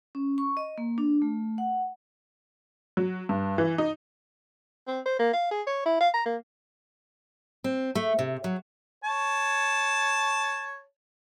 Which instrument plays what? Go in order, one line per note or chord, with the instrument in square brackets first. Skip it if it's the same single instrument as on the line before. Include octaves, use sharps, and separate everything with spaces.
[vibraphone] C#4
C#6
D#5
A#3
D4
A3
F#5
[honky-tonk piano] F#3
G2
E3
D#4
[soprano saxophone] C4
C5
A#3
F5
G#4
C#5
E4
F5
A#5
A#3
[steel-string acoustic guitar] C4
A3
C3
F#3
[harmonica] C#5 A5